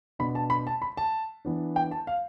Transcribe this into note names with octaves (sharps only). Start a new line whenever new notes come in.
B2 B3 D4 B5
A5
B5
A5
B5
A5
E3 B3 D4
G5
A5
F5